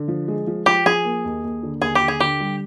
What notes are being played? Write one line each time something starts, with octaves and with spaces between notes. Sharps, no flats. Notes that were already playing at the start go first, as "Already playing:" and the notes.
Already playing: D3
F3
G#3
F3
F3 G4
F3 G#4
A#3
D#2
D#2
D3
D#2 G#4
G4
D3
G#4
D3 G4
G3